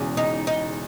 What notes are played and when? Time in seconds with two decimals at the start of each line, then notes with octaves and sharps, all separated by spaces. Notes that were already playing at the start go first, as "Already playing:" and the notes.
Already playing: E1 E2 C#3
0.17 D#4
0.47 D#4